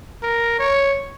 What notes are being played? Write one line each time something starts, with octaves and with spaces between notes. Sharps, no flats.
A#4
C#5